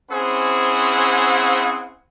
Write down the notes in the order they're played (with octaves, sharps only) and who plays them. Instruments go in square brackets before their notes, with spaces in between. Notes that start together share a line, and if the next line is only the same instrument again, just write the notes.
[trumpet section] C4 C#4 E4 G#4 C5 F#5